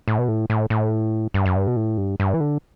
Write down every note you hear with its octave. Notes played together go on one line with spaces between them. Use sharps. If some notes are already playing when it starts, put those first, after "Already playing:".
A2
B2
A2
A2
A2
G2
F#2
G2
B2
A2
G2
G2
E3
D3